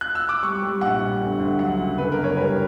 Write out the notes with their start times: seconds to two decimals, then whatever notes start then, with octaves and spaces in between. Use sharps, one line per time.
0.01 F#6
0.15 E6
0.29 D6
0.43 G3 C#6
0.62 G3
0.81 A#1 F#5
1.01 G3
1.21 D2
1.40 D2
1.59 F#3 F#5
1.78 C#3
1.98 D3 B4
2.12 A#4
2.18 F#1
2.24 C#5
2.37 G3 B4